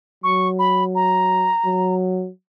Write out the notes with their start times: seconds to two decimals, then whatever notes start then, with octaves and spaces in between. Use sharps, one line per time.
0.23 F#3 C#6
0.59 B5
0.95 A#5
1.65 F#3